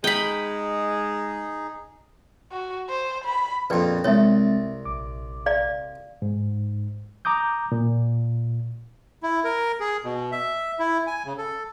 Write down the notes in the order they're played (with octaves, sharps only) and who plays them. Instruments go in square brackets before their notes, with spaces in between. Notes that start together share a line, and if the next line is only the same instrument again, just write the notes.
[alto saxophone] G#3 [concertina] D#4 G#4 [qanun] G5 B5
[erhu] F#4
C5
B5
[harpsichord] A#1 F2 [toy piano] B4 D5 G5
[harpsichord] C2 [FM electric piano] G#3 C4 A6 [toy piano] C#5 E5
[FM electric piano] A#1 D6
[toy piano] D5 F5
[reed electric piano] G#2
A#5 D6 D#6 G6
A#2
[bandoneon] E4
A#4
G#4
B2
E5
E4
G#5
C#3
A4